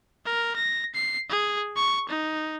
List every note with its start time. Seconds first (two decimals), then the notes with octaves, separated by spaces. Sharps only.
0.26 A#4
0.56 A#6
0.94 C7
1.30 G#4
1.77 C#6
2.09 D#4